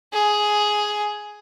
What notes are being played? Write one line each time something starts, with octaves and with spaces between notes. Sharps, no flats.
G#4